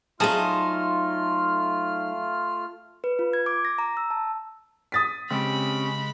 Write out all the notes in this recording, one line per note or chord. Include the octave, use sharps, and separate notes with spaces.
F#3 A3 D#4 F4 G#4 A5 D#6 F6
B4
F4
G#6
D6
A#6
A#5
E6
A5
D#6 A6 B6
C#3 G#3 C4 C#4 G4 B5